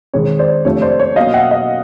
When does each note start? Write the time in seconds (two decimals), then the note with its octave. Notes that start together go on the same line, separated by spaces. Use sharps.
0.14 D#3 G#3 C4 C#5
0.39 C5 D5
0.65 C3 F3 A3 D4 C#5
0.82 C5 D5
1.00 C#5
1.16 B2 F#3 A#3 D#5 F5
1.34 E5 F#5
1.51 D#5 F5